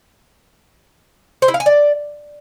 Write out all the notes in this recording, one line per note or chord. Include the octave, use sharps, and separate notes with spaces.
C5
E4
F5
G#5
D5